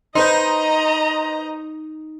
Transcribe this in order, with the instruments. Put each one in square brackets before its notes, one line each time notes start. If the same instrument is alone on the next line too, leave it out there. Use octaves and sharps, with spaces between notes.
[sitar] D#4 [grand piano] B4 C5 C6 [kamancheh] D#5 A#5